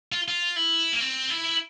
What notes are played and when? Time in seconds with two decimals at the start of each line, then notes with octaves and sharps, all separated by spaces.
0.12 F4
0.28 F4
0.56 E4
0.93 A#3
1.01 C4
1.30 E4